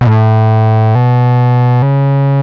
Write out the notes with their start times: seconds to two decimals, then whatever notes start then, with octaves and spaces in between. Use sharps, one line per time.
0.01 B2
0.07 A2
0.95 B2
1.82 C#3